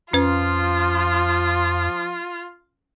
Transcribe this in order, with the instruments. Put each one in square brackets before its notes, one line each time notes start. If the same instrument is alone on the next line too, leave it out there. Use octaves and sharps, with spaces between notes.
[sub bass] F2 [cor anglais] F3 [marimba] C#4 B4 [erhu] F4